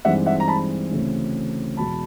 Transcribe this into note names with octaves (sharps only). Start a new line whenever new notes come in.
G2 E3 G#3 C4 D#4 E5 F#5
E5 F#5
A#5
A5 B5
D2 C#3 E3 A3 C4
E2 B2 G#3 A5 B5